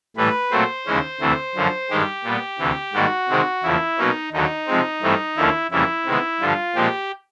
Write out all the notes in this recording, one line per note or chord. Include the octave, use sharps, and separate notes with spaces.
A2 E3 G3 B4
A#2 F#3 A3 C4 C5
D#2 C#3 E3 G#3 C#4
D2 C3 E3 A3
F#2 D3 F3
G2 D#3 G#3 G4
A#2 G3 B3
D2 C3 E3
G#2 D#3 G3 A#3 F#4
C3 D#3 G#3 C4
E2 C#3 F3 A#3 E4
B2 F#3 A#3 C#4 D#4
D#2 D3 F#3 D#4
C3 F3 G#3 C4
G2 E3 A3 C4
D#2 D3 F3 A#3 C#4 E4
F2 C#3 E3 G3 A#3 E4
C3 D#3 G#3 B3
G2 D3 F3 F4
A#2 F3 G#3 C4 G4